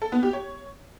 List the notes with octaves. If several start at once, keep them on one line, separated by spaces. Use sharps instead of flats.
A4
B3
G4
C#5